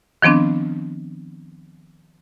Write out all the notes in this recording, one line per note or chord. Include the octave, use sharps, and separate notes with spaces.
D#3 F3 B3 C4 D4